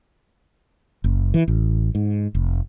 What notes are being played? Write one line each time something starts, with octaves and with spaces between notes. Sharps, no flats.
F#1
E3
A1
G#2
F1